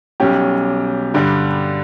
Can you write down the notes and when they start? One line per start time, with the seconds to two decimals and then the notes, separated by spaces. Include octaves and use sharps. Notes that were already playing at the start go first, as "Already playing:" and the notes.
0.20 B1 B2 G3 C#4 G4
1.14 G2 D3 G3